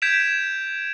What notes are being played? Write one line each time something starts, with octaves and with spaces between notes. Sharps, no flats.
G6 G#6 B6 D7 E7 F7